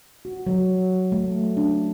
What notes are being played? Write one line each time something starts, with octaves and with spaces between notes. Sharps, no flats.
F#4
F#3
A3
D4